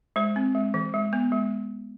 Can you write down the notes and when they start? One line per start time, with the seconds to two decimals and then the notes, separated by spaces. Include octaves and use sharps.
0.16 G#3 C5
0.36 C4
0.55 G#3
0.74 E3
0.94 G#3
1.13 B3
1.32 G#3